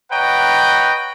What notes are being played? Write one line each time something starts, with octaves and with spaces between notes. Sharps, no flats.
B4 C#5 D#5 F#5 G5 A#5